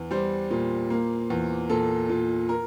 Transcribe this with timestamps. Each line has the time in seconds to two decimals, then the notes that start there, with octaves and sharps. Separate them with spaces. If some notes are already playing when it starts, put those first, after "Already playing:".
Already playing: E2
0.11 G3 C5
0.51 A#2
0.90 A#3
1.30 E2
1.70 A#2 A4
2.09 A#2
2.49 A#4